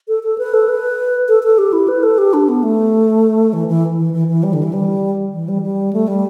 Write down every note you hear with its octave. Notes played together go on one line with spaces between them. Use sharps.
A4
A4
B4
A4
B4
A4
A4
G4
E4
B4
A4
G4
D4
B3
A3
E3
E3
E3
E3
E3
G3
D3
E3
G3
E3
G3
G3
A3
G3